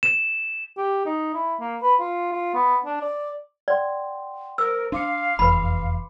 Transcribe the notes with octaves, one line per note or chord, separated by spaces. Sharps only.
E7
G4
D#4
E4
A#3
B4
F4
F4
B3
D4
D5
D5 F#5 G5 C6
A#4 C5 E6
D4 F5 C6 D6 C#7
F1 E2 B4 B5